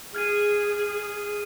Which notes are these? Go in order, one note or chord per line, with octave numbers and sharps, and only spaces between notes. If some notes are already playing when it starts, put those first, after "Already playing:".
G#4 F6 G#6 D#7
F6 G#6 D#7